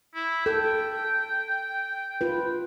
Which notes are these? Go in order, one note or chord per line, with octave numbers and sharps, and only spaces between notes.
E4
A4 G5
F4 B4